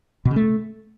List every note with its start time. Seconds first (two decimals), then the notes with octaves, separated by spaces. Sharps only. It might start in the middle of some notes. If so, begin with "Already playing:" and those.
0.25 B2
0.31 C#3
0.36 A3